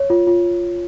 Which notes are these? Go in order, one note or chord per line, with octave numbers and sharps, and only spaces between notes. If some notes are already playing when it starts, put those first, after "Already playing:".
Already playing: C#5
F4
F4